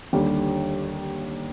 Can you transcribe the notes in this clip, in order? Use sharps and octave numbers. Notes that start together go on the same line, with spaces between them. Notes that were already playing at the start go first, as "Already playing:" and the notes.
D#2 D3 G3